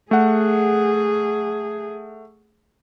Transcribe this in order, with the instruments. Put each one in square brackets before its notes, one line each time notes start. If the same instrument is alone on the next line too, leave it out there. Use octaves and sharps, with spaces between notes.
[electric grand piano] A3 F#5 [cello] G#4